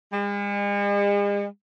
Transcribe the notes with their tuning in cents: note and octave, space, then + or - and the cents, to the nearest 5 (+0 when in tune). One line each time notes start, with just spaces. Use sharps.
G#3 -45